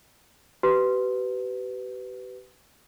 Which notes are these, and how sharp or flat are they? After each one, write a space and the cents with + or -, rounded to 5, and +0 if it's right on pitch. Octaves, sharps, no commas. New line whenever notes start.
G4 -40 B4 +15